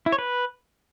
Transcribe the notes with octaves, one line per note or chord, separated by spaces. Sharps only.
E4
C#5
B4